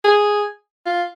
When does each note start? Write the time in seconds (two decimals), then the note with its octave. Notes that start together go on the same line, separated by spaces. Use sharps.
0.04 G#4
0.86 F4